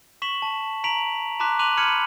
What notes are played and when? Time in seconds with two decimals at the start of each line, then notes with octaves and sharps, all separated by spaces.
0.22 C#6 B6 E7 F#7
0.42 A5
0.84 A#5 B6 D7 F7 F#7
1.40 A5 A#5 C6 D6 F#6 B6
1.59 C6 D6 F#6 D#7 F7 F#7
1.77 B5 F6 G#6 C#7 D#7 F#7